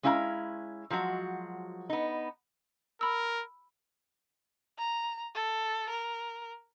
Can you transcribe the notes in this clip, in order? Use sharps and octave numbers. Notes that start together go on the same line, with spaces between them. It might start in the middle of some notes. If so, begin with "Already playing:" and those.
G#3 C#4 E4 F5 F#5 A#5
F3 F#3 G#3 F#4
B3 D#4
A#4 B5 E6
A#5
A4
A#4